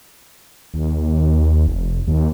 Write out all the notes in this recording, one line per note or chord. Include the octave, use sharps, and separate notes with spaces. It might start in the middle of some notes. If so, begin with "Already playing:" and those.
D#2
F1
D#2